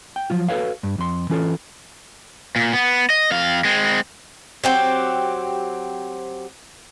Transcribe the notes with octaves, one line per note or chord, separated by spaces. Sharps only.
G5
F3 F#3 F4
F#4 A4 B4 C#5 F5
G2
F2 C6
E3 C#4 F4 A4
A#2
B3
D#5
F2 F5
G#3 C4
F#3 C4 G4